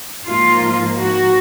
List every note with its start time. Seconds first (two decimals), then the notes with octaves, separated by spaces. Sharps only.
0.25 G#2 F3 A#3 F4
0.98 F#4